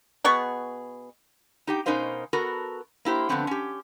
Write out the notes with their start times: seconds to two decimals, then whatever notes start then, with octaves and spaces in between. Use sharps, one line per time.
0.24 B2 B3 G#4 C#6
1.67 D#4 G4 G5
1.86 B2 C#4 D#4 A#4 C5 F5
2.33 B3 F#4 A4 A#4
3.05 A#3 E4 G4 C5
3.29 D3 F3 A3 B3 C4 D4
3.47 C#4 G4